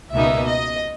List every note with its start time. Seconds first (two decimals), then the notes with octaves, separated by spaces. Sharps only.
0.12 C#2 B2 A#3 D#4 E5
0.48 D#5